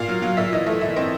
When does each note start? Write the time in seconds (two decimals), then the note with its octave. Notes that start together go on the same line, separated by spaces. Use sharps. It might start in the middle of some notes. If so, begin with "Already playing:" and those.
Already playing: A#2 F5
0.09 F#3
0.22 F#3
0.37 A#2 E5
0.52 E3 D#5
0.66 A3 E5
0.81 E3 E5
0.96 C4 D#5